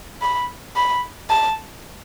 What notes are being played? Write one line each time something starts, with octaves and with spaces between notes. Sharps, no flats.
B5
B5
A5